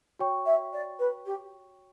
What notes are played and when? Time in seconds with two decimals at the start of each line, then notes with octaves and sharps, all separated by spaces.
0.19 F#4 C#5 G5 C#6
0.45 E5
0.72 D5
0.99 B4
1.25 G4